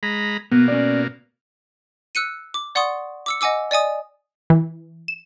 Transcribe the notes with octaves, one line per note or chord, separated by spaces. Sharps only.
G#3 A#5 B5
B2 A#3 B3
C#4 D5
E6 F#6 C#7 D#7
D6
D5 F#5 C6 C#6 D#6
D6 E6 C#7
D#5 F#5 G#5 D6 E6
D5 D#5 G#5 D#6
E3
E7